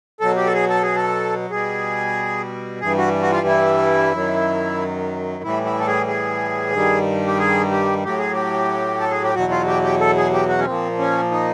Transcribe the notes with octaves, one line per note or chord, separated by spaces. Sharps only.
B2 F#3 A4
G4
A4
G#4
A4
G#4
A4
B2 G3 G#4
G2 E3 G3 G#4
F#4
F#4
F4
E4
F#2 D#3 F#3
A2 E3 G3 E4
E4
A4
G#4
G#4
G2 D#3 G3
G4
G#4
G4
A2 F#3 G4
G#4
G4
A4
G#4
G4
E2 B2 F#3 F#4
F4
G4
G4
A4
G#4
G4
F#4
C#4
A#2 F3 C4
C#4
D#4